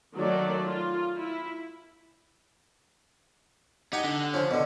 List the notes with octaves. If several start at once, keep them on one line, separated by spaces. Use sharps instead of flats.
D#3 F#3 A3 D5
F4
E4
D#4 G4 F#5 G#5
D3
F3 C#4
B2 D3